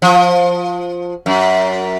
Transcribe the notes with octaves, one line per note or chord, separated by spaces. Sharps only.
F3
F#2